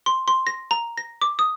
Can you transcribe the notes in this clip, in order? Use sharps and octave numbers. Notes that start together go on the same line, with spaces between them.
C6
C6
A#6
A#5
A#6
D6
D#6